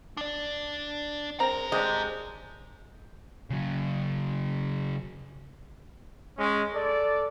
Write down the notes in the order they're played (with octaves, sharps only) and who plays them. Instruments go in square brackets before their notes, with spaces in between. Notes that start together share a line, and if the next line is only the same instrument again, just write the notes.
[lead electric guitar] D4 D5
[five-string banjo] C4 A#4 [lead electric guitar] G#4 A#5
[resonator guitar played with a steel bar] G#3 C4 [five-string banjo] D4 G4 D#5
[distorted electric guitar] C#3 F#3
[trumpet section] G#3 C#4
A4 D5